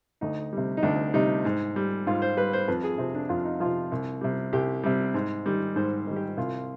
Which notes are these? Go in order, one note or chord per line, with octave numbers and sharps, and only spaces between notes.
D2 D#4
C3 G3
D#4
D2 D4
C3 G3 D#4
G#2
G3
G#2 F4
C5
G3 B4
C5
F2 B4
G#4
C3 F3 C4
D4
F2 F4
D#4
C3 F3 F4
C2
C3 G3
C2 G4
C3 G3
G#2
D#3 G3
G#2 C5
D#3 G3
G4
C2 F4